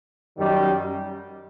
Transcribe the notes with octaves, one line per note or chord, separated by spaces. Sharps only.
F#2 D#3 G3